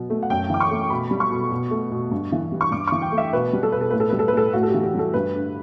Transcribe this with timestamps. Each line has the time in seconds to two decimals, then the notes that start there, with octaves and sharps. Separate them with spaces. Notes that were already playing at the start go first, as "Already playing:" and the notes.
Already playing: B2 F#3
0.10 A3
0.23 F#5
0.30 F#2 G5
0.50 E3 D6
0.60 C#6
0.71 A3
0.90 B2 B5
1.11 G3
1.20 C#6
1.31 B2
1.51 B2
1.71 A3
1.92 B2
2.11 G2
2.32 E3
2.52 G3
2.61 C#6
2.72 G2 D6
2.88 E3 C#6
3.02 G5
3.12 A3
3.18 E5
3.33 B2 B4
3.53 G3
3.63 A4
3.72 B2 B4
3.81 A4
3.91 A2 B4
4.00 A4
4.09 G3 B4
4.19 A4
4.28 B4
4.33 A2 A4
4.53 A2 F#4
4.63 A4
4.68 G4
4.74 E3
4.83 G4
4.95 G3 A4
5.14 G2 B4
5.35 D3